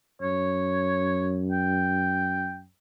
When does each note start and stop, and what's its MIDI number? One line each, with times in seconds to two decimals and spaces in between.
0.21 2.67 42
0.21 1.39 73
1.52 2.56 79